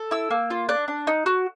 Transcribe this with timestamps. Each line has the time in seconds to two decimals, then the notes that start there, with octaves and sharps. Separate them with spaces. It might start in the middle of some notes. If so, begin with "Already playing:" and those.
Already playing: A4
0.11 E4 E6
0.31 A#3
0.50 F4
0.69 D4 F#6
0.88 D4
1.07 D#4
1.26 F#4